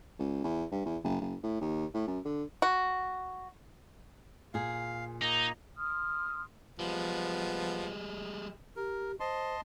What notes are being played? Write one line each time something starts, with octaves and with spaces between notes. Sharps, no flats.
C#2
E2
G2
E2
F#1
F#1
A2
D#2
A2
F#2
D3
F#4
A#2 G#4 F5
A#3 D#4 D#5
C6 D#6 F6
F3 G3 G#3 B3
G4 A#4
C5 D#5 A5 C6